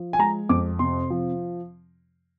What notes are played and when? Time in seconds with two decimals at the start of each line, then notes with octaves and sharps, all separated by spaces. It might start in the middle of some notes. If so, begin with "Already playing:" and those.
Already playing: F3
0.13 G#5
0.19 G#3 A#5
0.49 F2 D6
0.79 C3 C6
1.10 F3